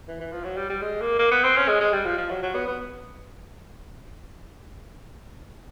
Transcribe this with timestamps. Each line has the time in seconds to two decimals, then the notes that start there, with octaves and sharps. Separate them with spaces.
0.08 E3
0.20 E3
0.32 F3
0.44 F#3
0.57 G3
0.70 G3
0.82 G#3
1.01 A#3
1.19 A#3
1.31 B3
1.44 C4
1.56 C#4
1.68 G#3
1.80 G#3
1.93 G3
2.05 F3
2.18 F3
2.30 F#3
2.42 F#3
2.55 B3
2.67 B3